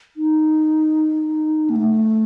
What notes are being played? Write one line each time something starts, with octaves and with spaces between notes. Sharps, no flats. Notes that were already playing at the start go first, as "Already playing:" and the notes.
D#4
A#3
A3